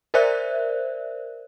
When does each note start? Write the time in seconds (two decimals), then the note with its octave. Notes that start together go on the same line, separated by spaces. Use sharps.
0.14 A#4 C5 D5 E5 F#6